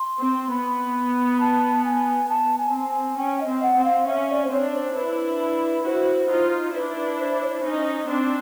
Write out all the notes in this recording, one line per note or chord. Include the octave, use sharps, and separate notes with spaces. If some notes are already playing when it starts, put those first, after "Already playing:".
Already playing: C6
C4
B3 B5
A5
G#5
B3 A5
G#5
C4
G#5
C#4 G5
D#5
C4
F#5
C4
F5
C#4 E5
D5
C5
C4 D4 C#5
C5
D4 E4 B4
E4 F#4 C5
D#4 F4
D4 E4 B4
B4
C5
C#5
C5
C#4 D#4
C4 D4